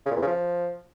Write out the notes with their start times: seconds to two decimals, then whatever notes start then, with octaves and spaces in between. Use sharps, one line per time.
0.06 C#3
0.11 A#2
0.16 E2
0.22 C#3
0.27 F3